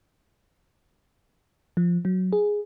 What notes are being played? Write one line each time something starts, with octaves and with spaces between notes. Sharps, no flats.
F3
F#3
G#4